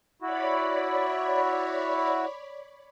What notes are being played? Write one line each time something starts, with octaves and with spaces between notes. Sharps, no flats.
E4 F#4 C#5 D5 B5